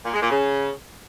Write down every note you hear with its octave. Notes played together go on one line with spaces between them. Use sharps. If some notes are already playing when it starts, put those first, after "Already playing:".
A#2
G#3
A#2
C#3